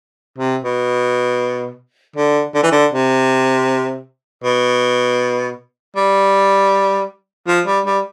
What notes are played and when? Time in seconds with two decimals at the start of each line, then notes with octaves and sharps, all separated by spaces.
0.38 C3
0.64 B2
2.16 D3
2.54 D3
2.63 E3
2.72 D3
2.92 C3
4.44 B2
5.96 G3
7.48 F3
7.67 G3
7.86 G3